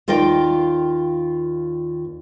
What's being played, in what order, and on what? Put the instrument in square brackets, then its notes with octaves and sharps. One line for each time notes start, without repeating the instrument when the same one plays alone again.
[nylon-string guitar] D#2 F4 A#4 D5 G5